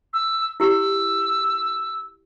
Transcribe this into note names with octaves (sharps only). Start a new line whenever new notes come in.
E6
E4 G4 E6